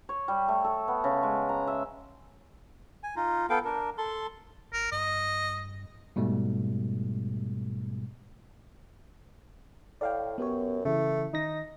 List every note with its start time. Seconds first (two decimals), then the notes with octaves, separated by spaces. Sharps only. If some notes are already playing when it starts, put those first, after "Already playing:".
0.09 C#5
0.28 G3
0.48 A3
0.64 A4
0.88 B3
1.04 C#3
1.23 G#3
1.49 A#5
1.67 E5
3.03 G#5
3.16 D#4 F4
3.50 B3 A4 F5 G5
3.65 D4 A#4
3.98 A4 A5 C6
4.73 G#1 A#4
4.92 G2 D#5
6.16 G#2 B2 G3 A3
10.01 A2 D5 F5 G5
10.38 F#2 B3 G4 C#5
10.85 C#3 E3 A3
11.33 D#3 D#4 A#6